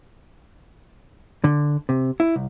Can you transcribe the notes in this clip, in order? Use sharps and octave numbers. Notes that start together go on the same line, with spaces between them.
D3
C3
E4
C2